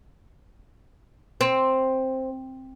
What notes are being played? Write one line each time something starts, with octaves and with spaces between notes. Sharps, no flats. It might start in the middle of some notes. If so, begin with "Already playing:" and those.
C4